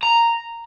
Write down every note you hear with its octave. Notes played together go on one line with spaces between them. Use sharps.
A#5